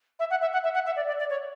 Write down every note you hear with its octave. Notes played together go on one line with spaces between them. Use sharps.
E5
F#5
E5
F#5
E5
F#5
E5
D5
D5
D5
C#5